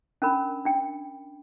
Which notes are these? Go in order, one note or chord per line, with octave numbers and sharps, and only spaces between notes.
C#4 D4 A#4 B5
D4 G5